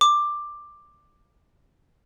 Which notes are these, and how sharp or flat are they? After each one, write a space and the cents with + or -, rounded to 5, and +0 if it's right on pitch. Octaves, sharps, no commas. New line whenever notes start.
D6 +10